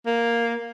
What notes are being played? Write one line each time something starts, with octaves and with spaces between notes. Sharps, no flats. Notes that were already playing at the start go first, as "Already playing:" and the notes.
A#3